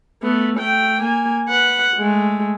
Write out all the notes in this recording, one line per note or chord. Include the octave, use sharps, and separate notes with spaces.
A3 B3
A3 G5
A#3 G#5
B4 F#5
G#3 A3